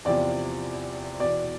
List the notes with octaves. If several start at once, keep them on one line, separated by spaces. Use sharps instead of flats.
E2 C3 F3 D5
E2 B2 D5